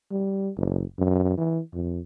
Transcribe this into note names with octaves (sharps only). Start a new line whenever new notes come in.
G3
F#1
F#2
E3
F2